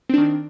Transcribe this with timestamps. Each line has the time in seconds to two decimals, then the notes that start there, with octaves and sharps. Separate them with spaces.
0.10 C4
0.14 D4
0.18 D#3